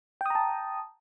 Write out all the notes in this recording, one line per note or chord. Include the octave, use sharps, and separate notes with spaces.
G5 A5 A#5 D#6